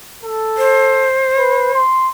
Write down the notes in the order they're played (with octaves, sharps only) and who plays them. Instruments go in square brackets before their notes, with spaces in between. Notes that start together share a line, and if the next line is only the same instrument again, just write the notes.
[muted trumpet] A4
[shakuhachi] C5
[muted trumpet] B4
C6